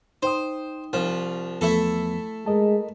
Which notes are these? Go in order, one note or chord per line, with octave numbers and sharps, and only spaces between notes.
D#4 C5 G5 D#6
C2 F3
E2 F3 A3 B3 E4 A4
G#3 A#4 D#5 A5